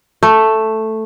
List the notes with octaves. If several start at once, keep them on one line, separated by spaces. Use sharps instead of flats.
A3